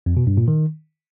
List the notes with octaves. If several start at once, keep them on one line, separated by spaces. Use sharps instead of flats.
F2
B2
G2
A#2
D#3